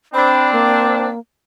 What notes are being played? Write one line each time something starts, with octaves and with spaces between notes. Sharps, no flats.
C4 D4 B5
A#3